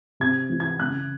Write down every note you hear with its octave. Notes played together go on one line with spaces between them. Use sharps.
C3 G#6
E3
G#6
C#3 F#6